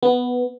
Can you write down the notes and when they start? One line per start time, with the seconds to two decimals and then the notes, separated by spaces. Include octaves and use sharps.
0.03 B3